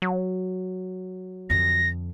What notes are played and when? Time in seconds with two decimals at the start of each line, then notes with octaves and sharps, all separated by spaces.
0.02 F#3
1.50 F2 D3 A#6